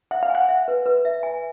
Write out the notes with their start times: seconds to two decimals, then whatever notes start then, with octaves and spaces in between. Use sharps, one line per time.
0.11 E5 F#5
0.23 F5
0.30 F#5 G#5
0.48 E5
0.68 B4
0.86 B4
1.05 E5
1.23 G#5